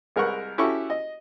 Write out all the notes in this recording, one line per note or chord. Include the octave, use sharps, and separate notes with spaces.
C2 G#3 A#4 B4 F#5 C#6
C#4 E4 F#4 G4 A4 C#6
D#5